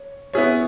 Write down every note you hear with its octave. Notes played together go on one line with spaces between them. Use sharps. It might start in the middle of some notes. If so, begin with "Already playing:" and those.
Already playing: C#5
B3 E4 G#4 C#5